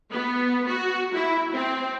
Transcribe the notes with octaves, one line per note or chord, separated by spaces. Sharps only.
B3
F#4
E4
C4